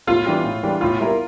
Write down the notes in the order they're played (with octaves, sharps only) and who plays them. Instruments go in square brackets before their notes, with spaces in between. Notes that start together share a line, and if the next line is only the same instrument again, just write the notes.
[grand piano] A2 [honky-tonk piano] F4
[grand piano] E3 G3 D4 G4
A2
E3 G3 D4 G4
[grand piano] A2 [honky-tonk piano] F4
[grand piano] G3 A#3 E4 A#4